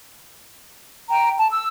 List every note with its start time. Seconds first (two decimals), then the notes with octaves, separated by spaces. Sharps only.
1.10 G5 A#5
1.37 A5
1.52 E6